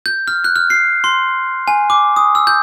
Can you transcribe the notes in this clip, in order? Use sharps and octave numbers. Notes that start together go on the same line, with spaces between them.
G6
F6
F#6
F6
C7
C6
G#5
D6
D#6
E6
G6